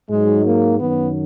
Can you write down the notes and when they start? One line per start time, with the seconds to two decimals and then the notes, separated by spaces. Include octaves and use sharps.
0.09 G#2 F#3 G#3
0.44 A#3
0.78 F#2 D#3 F#3 B3